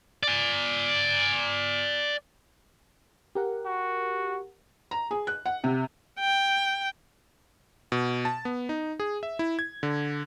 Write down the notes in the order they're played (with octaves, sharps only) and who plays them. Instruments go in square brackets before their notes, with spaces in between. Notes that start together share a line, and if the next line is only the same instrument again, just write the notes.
[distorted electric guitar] D5 G#5
[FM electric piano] G4 A#4 F#5
[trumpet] F#4
[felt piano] A#5
G#4
F#6
F#5
C3
[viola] G5
[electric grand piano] B2
A5
B3
D#4
G#4
E5
E4
G#6
D3